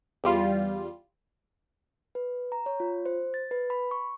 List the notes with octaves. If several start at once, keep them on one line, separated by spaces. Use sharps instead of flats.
E2 G3 F4
B4
A#5
C#5
F4
C5
A6
B4
B5
C#6